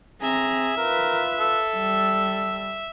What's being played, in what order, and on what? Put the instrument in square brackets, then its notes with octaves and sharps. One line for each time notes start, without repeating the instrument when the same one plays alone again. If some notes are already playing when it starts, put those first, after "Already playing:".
[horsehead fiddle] C4 A#5 [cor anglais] G#4 [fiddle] E5
[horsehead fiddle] F4 B4 [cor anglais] A#4
[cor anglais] A4
[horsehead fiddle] G3